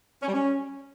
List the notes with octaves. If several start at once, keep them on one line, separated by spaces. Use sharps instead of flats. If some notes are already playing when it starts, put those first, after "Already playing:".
C#4
G3
C#4